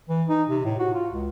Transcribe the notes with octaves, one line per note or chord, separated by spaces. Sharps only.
E3
D#4
C3
A2
F#4
F4
C#2